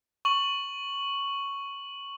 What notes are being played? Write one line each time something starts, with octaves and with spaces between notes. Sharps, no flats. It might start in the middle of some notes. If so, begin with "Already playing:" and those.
C#6 F#7